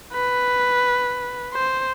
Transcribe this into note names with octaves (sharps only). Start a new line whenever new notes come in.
B4
C5